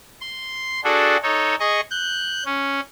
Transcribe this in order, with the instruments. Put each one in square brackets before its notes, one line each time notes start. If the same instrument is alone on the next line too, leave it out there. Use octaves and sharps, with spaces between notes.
[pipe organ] C6
D4 F#4 G#4 A4
D#4 A4 C#5
G#4 D#5 C#6
F#6 G6
C#4